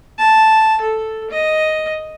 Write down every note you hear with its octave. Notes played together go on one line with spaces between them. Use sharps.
A5
A4
D#5